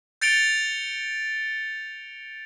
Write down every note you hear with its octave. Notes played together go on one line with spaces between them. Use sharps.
G6 A6 C#7 D7 F7 G7